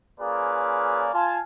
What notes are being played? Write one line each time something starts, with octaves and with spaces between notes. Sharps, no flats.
A#3 C#4 F4 G#4 B4 D5
F4 G#5 A5